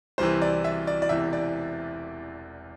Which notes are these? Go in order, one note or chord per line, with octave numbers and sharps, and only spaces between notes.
C2 C3 E3 C5
D5
E5
D5
D5
E1 E2 C3 E3 E5
D5